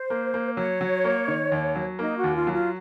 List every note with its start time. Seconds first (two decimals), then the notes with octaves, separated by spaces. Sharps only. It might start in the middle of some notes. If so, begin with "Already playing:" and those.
Already playing: C5
0.10 A#3
0.34 A#3
0.57 F#3 C#5
0.81 F#3
1.04 A#3
1.28 D#3
1.52 D#2
1.76 F#3
1.99 A#3 D#4
2.17 F#4
2.24 D#2
2.35 F4
2.47 F#3
2.53 F4